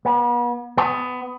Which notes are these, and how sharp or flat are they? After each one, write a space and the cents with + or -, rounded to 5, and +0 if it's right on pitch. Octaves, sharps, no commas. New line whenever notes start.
B3 -40
B3 +20